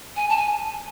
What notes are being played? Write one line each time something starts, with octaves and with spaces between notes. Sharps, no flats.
G#5
A5
G#5